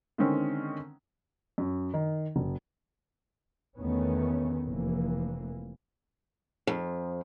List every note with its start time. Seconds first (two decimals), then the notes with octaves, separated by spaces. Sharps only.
0.18 D3 D#3 G#3 C4 C#4
1.58 F#2
1.94 D#3
2.36 F#1
3.78 E2 D#3 A3 B3 C#4
4.67 F1 E3 A#3
6.67 F2